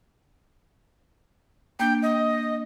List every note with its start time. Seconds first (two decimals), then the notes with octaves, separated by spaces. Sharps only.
1.80 A#3 D4 G5
2.02 D#5